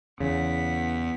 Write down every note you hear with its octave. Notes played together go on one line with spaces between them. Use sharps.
E2 C#3 F#5 B6